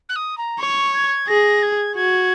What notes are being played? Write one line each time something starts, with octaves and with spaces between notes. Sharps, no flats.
F#6
D#6
A#5
C#5 C#6
G#6
G#4 A#6
G#6
F#4 G#6